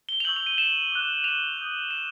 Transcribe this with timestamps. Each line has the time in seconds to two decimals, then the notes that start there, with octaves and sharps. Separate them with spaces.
0.09 G7
0.20 F7
0.25 C#6 E6 G6 F#7
0.36 F7
0.46 D#7
0.58 E7
0.91 D6 F#6
1.24 F7
1.57 D#6 G6
1.91 E7